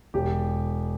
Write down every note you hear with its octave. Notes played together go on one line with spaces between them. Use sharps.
E1 G4